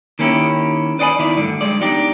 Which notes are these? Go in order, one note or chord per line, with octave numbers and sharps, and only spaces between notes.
D#3 A#3 C#4 E4 G4
B4 D5 D#5 F5 G#5 B5
E2 D#3 E4 D5
D2 G2 D3
G2 C#3 G#3 D5
E2 D4 D#4 G4 D5